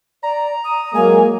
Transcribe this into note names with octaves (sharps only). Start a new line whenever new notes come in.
D5 A#5
D#6
F#3 G#3 A#3 G#5